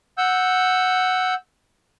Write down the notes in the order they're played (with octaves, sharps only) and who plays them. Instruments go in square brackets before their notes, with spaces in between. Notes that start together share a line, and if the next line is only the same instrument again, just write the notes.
[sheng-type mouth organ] F#5 E6 G6